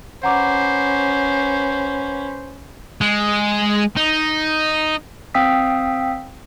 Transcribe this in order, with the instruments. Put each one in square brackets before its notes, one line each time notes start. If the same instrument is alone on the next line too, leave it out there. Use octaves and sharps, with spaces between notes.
[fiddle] C#4 B4 [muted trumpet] C5 [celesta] F#5 A#5 D6
[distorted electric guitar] G#3
D#4
[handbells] C4 F5 G5 D#6 E6 B6